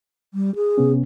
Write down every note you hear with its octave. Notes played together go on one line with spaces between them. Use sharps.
G3
G#4
C3 B3 C#4